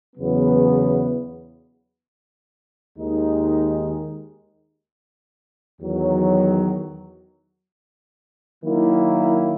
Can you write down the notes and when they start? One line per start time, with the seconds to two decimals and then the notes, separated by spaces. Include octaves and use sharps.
0.16 E2 C#3 F#3 B3
2.98 D#2 D#3 G#3 D#4
5.81 E2 D#3 F#3
8.64 D#3 F#3 A#3 E4